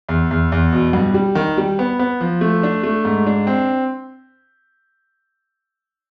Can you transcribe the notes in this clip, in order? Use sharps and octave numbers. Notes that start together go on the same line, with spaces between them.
E2
E2
E2
B2
G2
G3
D#3
G3
B3
B3
F3
A3
D4
A3
G#2
D4
C4